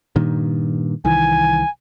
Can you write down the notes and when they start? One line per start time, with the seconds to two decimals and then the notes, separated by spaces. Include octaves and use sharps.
0.16 G2 A#2 D#3
1.05 C2 D#3 E3 G#5